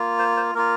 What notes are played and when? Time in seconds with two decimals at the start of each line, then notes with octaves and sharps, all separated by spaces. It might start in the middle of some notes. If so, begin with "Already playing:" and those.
Already playing: A#3 F4
0.19 C5
0.37 C5
0.55 A#3 F4 A#4